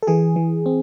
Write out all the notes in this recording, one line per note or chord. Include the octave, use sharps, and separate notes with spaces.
A4
E3 G#4
E3
C4